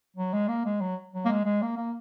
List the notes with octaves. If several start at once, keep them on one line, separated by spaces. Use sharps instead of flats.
F#3
G#3
A#3
G#3
F#3
F#3
A#3
G#3
G#3
A#3
A#3